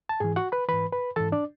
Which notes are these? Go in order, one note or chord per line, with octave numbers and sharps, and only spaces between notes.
A5
G#2 E3 G#4 G#5
F#4 F#5
B4 B5
G#2 E3 B4 B5
B4 B5
G#2 E3 A4 A5
D4 D5